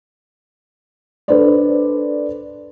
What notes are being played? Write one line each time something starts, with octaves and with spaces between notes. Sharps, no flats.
D4 A4 B4 C5 D5